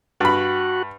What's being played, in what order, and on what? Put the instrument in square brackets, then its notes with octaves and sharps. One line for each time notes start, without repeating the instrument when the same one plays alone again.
[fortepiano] G2 B5 [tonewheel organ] F#4